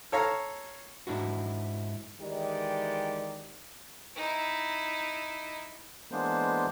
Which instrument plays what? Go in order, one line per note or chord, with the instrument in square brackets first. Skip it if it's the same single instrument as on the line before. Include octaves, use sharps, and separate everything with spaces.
[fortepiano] A4 C#5 F5 A#5
[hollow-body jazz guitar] G#2 D4 E4 F#4
[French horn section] D#3 E3 G#3 G4 D5
[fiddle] D#4 E4
[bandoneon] E3 G#3 A#3 B3 D4 C5